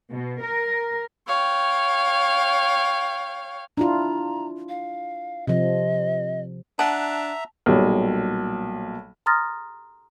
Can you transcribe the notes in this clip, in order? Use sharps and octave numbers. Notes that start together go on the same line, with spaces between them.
B2
A#4
C#5 F5 G5
D4 E4 F4 A#5
F5
C3 F3 D#5
D4 E5 F#5 A5 A#5
B1 A#2 F#3 G3
A#5 C6 D#6 F6 A6 A#6